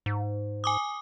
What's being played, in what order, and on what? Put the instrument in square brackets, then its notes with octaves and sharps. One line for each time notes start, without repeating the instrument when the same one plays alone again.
[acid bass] G#2
[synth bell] G#5 D6 D#6